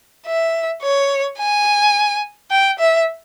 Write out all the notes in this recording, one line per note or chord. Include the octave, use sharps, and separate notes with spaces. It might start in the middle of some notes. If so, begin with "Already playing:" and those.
E5
C#5
G#5
G5
E5